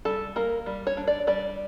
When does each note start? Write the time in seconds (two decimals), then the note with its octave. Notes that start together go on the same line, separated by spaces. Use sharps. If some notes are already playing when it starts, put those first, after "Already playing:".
0.05 G3 A4
0.36 A#3 A#4
0.66 G3
0.87 C#5
0.97 D4
1.07 D5
1.27 G3 D5